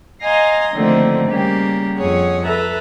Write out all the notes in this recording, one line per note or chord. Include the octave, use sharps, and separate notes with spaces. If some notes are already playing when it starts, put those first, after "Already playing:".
D#5 F5 G#5 A#5 C6 D#6
D3 D#3 F3 A3 A#3 C4
C#3 G3 A#3 G4
F2 G#4 C#5 F#5
A4 B4 E5 A#5